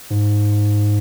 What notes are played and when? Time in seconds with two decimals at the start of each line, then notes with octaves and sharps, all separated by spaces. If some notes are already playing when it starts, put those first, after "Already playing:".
0.10 G#2